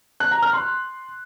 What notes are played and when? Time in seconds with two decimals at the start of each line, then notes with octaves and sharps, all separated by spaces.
0.20 F#6
0.31 A#5
0.42 F6
0.53 C6